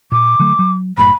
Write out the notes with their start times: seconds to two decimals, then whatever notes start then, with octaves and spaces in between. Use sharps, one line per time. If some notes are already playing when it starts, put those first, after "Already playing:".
0.12 A#2 D6
0.39 D3 F#3 A3
0.59 F#3
0.98 F#1 F#2 A2 B5